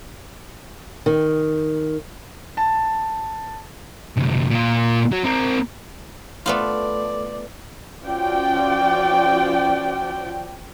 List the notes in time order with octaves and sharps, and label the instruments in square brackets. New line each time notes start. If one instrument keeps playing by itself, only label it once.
[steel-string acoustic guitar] D#3
[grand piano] A5
[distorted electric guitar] C2 F#2
A#2 F4
F#3 F#4
C4 A#4
[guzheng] A3 B3 F4 [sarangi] D5
[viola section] F3 C#4 F4 F#4 D5 G5